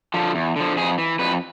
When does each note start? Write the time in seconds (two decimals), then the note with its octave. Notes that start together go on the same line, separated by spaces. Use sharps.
0.14 D3 F3
0.35 E2
0.56 D3 F3
0.77 F2 G#4
0.98 E3
1.19 F2 B4